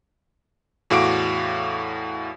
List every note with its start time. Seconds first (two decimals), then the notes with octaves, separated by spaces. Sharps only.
0.90 E2 A2 F#4 F5 D6 D7